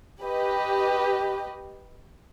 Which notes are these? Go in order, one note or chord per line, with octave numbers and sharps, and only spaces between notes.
G4 B4 D#5